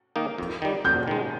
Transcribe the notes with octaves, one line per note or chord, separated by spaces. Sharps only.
D#3 A#3 D#4
F2
D#3 G3
F2 G6
D#3 G#3